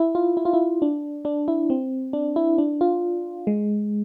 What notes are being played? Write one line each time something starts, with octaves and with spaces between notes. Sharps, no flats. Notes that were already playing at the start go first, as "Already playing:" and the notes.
Already playing: E4
F4
E4
F4
E4
D4
D4
E4
C4
D4
E4
D4
F4
G#3